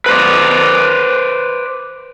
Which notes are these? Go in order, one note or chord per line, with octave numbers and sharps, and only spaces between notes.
B4 C5 D5